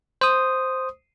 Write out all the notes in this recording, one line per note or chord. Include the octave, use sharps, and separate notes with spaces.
C5 D#6